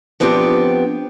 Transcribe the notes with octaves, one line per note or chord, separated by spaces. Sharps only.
F3 B3 C4 D4 F4 G4